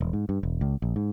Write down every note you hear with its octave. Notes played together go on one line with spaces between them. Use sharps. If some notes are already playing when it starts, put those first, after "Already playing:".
E1
G#2
G2
E1
C#2
A#1
G#2